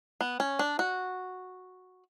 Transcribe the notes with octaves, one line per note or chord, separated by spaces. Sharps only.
B3
C#4
D4
F#4